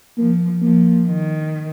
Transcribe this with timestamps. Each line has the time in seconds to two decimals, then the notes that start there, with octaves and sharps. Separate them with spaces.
0.18 F3 A#3
0.62 F3 A#3
1.07 D#3